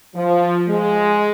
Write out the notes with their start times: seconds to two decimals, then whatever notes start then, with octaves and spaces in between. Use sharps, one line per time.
0.15 F3
0.68 G#3